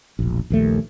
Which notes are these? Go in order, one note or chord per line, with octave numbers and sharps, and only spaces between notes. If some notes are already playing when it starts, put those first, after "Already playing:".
E1 A#1
A#1 D#2 A3